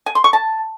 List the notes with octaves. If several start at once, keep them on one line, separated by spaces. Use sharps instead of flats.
G#5
C6
C#6
A5